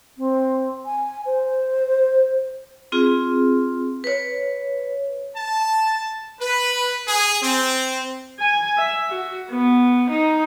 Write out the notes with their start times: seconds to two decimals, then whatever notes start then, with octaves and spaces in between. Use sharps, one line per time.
0.18 C4
0.86 G#5
1.26 C5
2.92 C4 F4 G#4
4.04 B4 C#5
5.37 A5
6.41 B4
7.08 G#4
7.42 C4
8.39 G#5
8.78 E5
9.09 F#4
9.50 B3
10.10 D#4